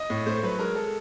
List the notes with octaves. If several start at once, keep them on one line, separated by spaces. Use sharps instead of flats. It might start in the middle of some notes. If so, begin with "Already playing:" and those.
Already playing: D#5
A2
A3 C5
F#3 B4
G#3 A#4
A4